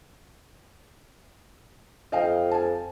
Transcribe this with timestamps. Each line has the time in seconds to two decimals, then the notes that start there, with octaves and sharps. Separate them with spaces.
2.12 F2 D#5 F5 G5
2.51 G#5 A5